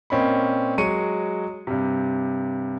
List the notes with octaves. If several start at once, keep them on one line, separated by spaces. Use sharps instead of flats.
A#2 C4 C#4 D#5 B5
F#3 G#3 C#6 C#7 D#7
G2 C3